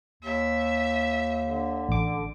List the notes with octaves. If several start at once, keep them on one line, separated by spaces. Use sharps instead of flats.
D#2 E5
D3
A1 D6